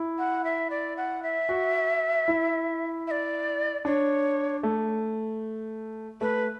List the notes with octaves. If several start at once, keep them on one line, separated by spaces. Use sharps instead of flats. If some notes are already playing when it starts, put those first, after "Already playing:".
Already playing: E4
F#5
E5
D5
F#5
E5
F#4
E4
E5
D5
D4 C#5
A3
A3 B4